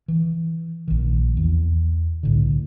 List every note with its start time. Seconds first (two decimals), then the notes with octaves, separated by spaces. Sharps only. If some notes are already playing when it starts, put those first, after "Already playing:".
0.08 E3
0.88 A#1 D#3
1.37 E2 E3
2.23 C2 A2 D3